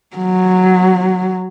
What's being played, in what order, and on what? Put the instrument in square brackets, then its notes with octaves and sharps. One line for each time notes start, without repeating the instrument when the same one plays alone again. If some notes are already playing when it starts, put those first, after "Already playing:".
[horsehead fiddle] F#3